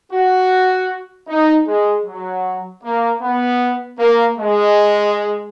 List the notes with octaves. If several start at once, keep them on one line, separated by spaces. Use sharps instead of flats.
F#4
D#4
G#3
F#3
A#3
B3
A#3
G#3